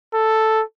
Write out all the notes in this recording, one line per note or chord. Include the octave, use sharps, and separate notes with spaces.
A4